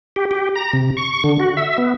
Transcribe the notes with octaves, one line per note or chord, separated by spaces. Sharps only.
G4
G4
A#5
C3
C#6
D3
F#4
E5
B3